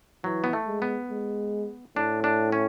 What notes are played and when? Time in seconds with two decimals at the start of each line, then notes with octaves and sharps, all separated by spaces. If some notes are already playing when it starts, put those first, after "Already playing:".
0.24 E3 F#3
0.44 B3
0.53 A3
0.67 G#3
0.82 B3
1.10 G#3
1.96 A2 D4
2.24 D4
2.52 C#4